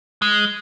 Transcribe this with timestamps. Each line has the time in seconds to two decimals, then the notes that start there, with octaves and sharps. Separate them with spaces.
0.22 G#3